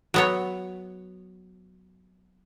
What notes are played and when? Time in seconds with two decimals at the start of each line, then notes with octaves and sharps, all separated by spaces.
0.14 F#3 B3 C#5